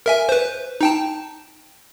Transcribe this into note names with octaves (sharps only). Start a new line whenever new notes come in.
A#4 E5 G#5
B4 C5
D#4 G5 A5